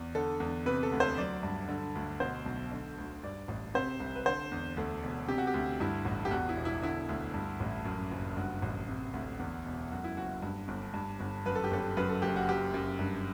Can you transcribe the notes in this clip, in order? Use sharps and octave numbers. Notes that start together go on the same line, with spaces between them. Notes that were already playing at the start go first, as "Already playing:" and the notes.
Already playing: E2
D3 A4
E2
C3 B4
A4
D2
C5
F#3 D5
G2
D3
D2
B2 C5
B1
D3
D2
G2 D5
A1
C3 C5
C2
B4
D3 C5
E2
D2 A4
E1
C3 G4
F#4
G4
D2
G2 E4
A1
G4
E2 F#4
E4
E1
E4
D3 E4
D2
G2
A1
F#2
F#1
G2 F#4
A1
C3
D2
E2
E1
F#2 F#4
E4
F#1 F#4
G2
G1
G2
G1
F#2 B4
A4
G4
G1 A4
F#2 B4
A4
F#1 G4
F#4
F#3 G4
F#2
G2